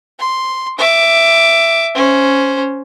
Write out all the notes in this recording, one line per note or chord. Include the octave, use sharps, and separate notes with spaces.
C6
E5 D6
C#4 C5